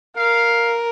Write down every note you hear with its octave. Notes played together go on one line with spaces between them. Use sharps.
A#4 F5